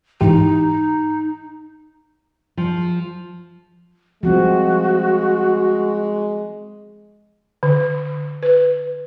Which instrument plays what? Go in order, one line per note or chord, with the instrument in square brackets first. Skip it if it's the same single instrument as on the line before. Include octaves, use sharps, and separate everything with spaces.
[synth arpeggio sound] G#2 E3 G4 [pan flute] D#4
[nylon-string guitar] F3
[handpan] F3 G3 C4 [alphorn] G#3 [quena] F#4
[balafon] D3
B4